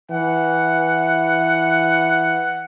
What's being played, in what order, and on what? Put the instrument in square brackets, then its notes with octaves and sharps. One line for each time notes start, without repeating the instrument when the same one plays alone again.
[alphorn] E3 [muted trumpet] F#5